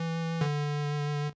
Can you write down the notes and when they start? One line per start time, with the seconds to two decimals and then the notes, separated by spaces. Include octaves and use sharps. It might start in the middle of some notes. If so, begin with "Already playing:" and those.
Already playing: E3
0.41 D3